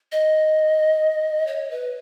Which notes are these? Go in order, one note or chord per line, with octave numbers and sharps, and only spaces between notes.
D#5
C#5
B4